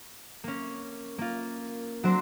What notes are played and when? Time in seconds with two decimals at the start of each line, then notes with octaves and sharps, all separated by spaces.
0.44 A#3 C#4
1.18 A#3 F4
2.04 F#3 C4 D4 A#4 C5